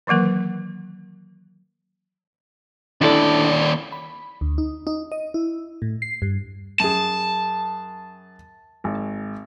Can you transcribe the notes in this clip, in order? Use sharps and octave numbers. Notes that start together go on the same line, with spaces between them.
D#3 E3 F#3 A#3 A#4
D#2 D4 E4 A4 D5
B5
D2
D#4
D#4
D#5
E4
A2
C7
G2
F#2 G#4 A5
G#1